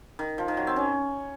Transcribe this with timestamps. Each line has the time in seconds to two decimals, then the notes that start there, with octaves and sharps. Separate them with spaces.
0.19 D#3
0.38 F3
0.48 D#3
0.57 F#3
0.67 C4
0.76 C#4